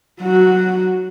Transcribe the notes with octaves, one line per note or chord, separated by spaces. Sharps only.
F#3 F#4